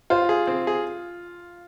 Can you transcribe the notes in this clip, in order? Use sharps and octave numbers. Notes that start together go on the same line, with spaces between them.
F4 C5
G#4
C4
G#4